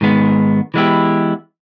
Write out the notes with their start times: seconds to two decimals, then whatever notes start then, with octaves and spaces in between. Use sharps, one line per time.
0.01 G#2 D#3 G#3 B3
0.74 E3 G#3 B3 E4 G4